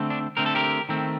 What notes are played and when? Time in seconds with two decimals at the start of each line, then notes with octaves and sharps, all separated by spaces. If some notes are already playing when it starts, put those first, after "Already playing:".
Already playing: D3 A3 C4
0.10 D4
0.37 D3 A3 C4 A#4
0.46 A4
0.55 G4 A#4
0.89 D#3 A3 C4